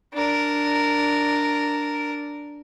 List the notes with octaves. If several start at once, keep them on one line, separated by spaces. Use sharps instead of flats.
D4 A#4